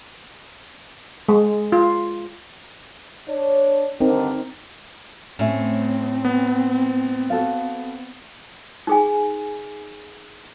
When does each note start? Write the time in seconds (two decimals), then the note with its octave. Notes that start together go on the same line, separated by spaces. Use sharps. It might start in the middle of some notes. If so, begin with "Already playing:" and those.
1.29 G#3
1.72 F4
3.28 D4 C#5
4.01 G2 D3 D#3 C4 D#4 A#4
5.39 A2 C4 C#4 E5
6.25 B3
7.30 F#4 A4 F5
8.87 D#4 G#4 G#5